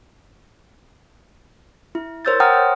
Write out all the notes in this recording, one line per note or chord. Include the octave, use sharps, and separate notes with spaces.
E4
A#4 C5 C#5 E6 G6 A6
F#5 G5 A#5 D#6 F6
C5 C#5